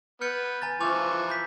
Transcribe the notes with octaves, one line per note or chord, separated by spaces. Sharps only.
B3 F6 G6 C#7
G#5 A#5 A6
E3 F3 G#5 C#6 D6 F7
B5 G6 B6